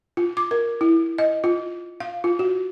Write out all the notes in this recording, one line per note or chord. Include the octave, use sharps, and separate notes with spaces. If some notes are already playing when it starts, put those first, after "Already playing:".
F4
D6
A#4
E4
D#5
F4
F5
F4
F#4